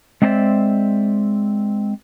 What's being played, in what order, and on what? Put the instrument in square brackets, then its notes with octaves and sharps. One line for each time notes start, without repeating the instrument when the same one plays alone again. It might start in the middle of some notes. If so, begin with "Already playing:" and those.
[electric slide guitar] G#3 C4 D4 C5 D5 E5